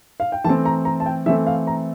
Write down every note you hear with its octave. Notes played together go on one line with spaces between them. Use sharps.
F5
G5
E3 A3 C4 A5
A#5
A#5
A5
G5
E3 A3 C4 E5
F5
A#5